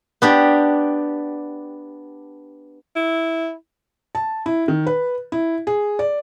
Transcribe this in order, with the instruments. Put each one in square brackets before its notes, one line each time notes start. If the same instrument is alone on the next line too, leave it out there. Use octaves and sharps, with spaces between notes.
[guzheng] B3 D4 G4
[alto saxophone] E4
[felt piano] A5
E4
D#3
B4
E4
G#4
D5